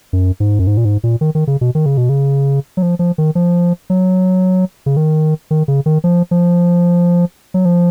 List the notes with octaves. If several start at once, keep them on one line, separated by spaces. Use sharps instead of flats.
F#2
G#2
F#2
G#2
A#2
G#2
A#2
D#3
D#3
C#3
B2
D#3
C#3
B2
C#3
F#3
F3
F3
D#3
F3
F#3
C#3
D#3
D#3
C#3
D#3
F3
F3
F#3
F3